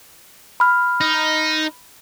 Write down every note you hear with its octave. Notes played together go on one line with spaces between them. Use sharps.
B5 F6
D#4